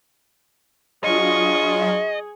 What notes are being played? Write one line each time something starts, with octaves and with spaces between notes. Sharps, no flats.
F#3 D4 F4 G#4 D#5 C#6